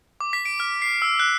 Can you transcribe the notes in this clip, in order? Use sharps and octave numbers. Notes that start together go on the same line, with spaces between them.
D6
B6
D7
F6
C7
E6
F#6